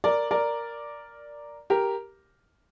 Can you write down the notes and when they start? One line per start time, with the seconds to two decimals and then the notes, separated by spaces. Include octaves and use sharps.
0.04 A#4 D5
0.31 A#4 D5
1.70 G4 A#4